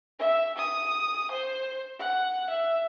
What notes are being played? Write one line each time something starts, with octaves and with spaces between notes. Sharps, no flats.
E5
D#6
C5
F#5
E5